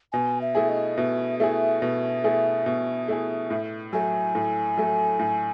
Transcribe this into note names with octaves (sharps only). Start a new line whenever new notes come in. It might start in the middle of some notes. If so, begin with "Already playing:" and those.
B2 G#5
E5
A3 E4 G#4
D#5
B2 E5
A3 E4 G#4 E5
B2
A3 E4 G#4
B2
A3 E4 G#4
A2
F#3 A3 G#5
A2
F#3 A3
A2